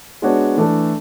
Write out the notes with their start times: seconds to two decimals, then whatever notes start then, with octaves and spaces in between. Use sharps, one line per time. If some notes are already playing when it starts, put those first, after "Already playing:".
0.22 G#3 B3 D4 F#4 C#5
0.57 E3 A3 D4 A4